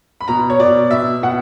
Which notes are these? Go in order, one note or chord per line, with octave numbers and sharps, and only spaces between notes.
B5
B2 A#5
C#5
B2 D5
B2 E5
B2 F#5